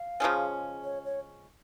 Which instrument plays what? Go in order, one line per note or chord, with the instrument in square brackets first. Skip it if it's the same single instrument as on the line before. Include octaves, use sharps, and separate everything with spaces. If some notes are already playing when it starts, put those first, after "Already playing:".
Already playing: [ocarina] F5
[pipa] C#3 F3 G#3 C#4
[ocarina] C#5
C#5